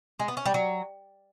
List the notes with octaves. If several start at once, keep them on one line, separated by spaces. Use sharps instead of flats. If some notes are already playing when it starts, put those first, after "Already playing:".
G#3
B3
C#4
G3
F#3